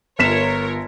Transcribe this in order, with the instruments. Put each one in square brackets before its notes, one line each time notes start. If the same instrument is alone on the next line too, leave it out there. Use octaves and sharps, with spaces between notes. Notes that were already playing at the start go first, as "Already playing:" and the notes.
[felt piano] G1 B6 E7 [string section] F4 A#4 C#5